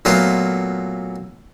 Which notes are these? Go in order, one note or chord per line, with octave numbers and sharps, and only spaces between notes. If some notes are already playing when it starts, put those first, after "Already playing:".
A#2 F#3 A3 B3 F4